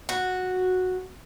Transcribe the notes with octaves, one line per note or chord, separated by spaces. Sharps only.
F#4